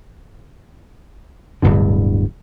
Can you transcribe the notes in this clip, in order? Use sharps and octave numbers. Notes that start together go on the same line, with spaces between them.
D1 G2 B2 D3